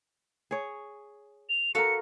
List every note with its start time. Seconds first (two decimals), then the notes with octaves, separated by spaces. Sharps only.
0.51 G#4 C#5
1.49 F7
1.75 F#4 A4 A#4 F5 C#7